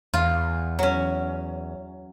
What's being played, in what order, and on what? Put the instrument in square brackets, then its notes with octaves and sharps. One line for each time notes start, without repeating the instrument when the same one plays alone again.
[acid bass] E2 [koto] F4
[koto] F#3 C#4